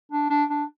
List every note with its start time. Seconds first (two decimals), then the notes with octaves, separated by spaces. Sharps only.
0.12 D4
0.30 D4
0.50 D4